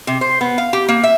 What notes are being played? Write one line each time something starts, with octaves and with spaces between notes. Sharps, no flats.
C3
C5
B3
F5
G4
A#3
E5